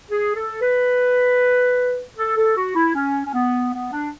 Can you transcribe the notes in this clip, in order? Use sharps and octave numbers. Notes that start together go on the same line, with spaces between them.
G#4
A4
B4
A4
A4
F#4
E4
C#4
C#4
B3
B3
D4